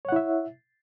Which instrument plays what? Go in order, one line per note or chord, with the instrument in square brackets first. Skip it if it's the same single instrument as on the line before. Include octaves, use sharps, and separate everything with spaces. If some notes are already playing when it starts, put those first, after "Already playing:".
[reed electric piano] C#5
F#5
E4
E5